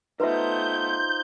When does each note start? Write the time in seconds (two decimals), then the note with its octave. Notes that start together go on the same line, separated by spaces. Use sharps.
0.20 A3 B3 D#4 F4 B4 C5 E5 G6